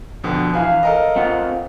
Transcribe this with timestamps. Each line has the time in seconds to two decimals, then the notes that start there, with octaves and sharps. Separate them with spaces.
0.24 F2 B2 D3
0.54 E3 B4 F5 G#5
0.83 A4 A#4 D#5
1.16 C4 F4 F#5